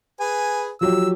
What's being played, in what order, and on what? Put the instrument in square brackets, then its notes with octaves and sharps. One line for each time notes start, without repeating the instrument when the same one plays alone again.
[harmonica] G#4 B4 G#5
[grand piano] F3 F#3 G4 [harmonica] E6